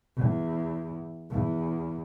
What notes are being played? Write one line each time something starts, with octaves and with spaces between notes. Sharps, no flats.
E2
E2